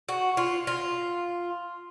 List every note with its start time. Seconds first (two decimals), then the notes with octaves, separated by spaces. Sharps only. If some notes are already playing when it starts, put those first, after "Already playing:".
0.09 F#4
0.37 F4
0.67 F4